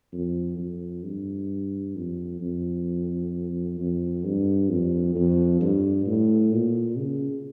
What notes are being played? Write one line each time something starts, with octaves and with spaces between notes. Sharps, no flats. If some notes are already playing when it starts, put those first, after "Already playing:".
F2
F2
G2
F2
F2
F2
G2
F2
F2
G2
A2
A#2
C#3